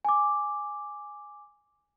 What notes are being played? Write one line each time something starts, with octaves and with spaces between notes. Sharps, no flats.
G#5 D6